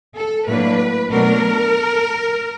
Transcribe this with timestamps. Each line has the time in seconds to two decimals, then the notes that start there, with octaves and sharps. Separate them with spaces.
0.15 A4
0.47 A2 F#3 A#3 D4 B4
1.11 B2 F#3 A3 D4 A#4